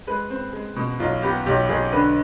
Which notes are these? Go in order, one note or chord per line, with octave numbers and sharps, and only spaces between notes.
G#3 B4
C4
G#3
B2
B1 F4
B3 G4
B1 G4
B1 G#4
D3 B4